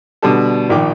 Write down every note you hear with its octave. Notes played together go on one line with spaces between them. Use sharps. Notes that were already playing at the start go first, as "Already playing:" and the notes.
B2 D3 G3 B3 D4 A4
A#1 A#2 D#3 G5 D6